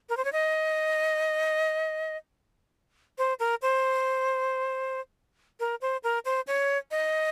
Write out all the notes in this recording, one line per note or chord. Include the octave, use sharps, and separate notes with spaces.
A#4
C5
C#5
D#5
C5
A#4
C5
A#4
C5
A#4
C5
C#5
D#5